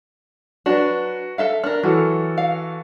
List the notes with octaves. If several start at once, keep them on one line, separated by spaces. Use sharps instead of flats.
F#3 D4 F#4 B4
A4 E5 F5
D4 A#4 F6
E3 F#3 F#4 A4
F5